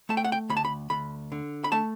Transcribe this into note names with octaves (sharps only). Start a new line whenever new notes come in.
A3 A5
G5
F#5
G5
D2 B5
A5
B5
D2 B5
D3
B5
A3 A5